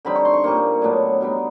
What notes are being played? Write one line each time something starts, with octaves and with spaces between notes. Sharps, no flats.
D3 G3 C4 D#4 B5
C#6
C6
C#6
A#2 G3 A#3 C#6
A2 F#3 B3 D4
B2 G3 B3 D#4